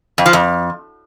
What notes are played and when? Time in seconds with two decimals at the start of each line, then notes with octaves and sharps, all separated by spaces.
0.18 F2
0.26 F3
0.33 F2